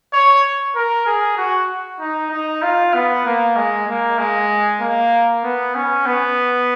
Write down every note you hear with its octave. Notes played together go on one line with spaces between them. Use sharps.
C#5
A#4
G#4
F#4
D#4
D#4
F4
B3
A#3
G#3
A#3
G#3
A#3
B3
C#4
B3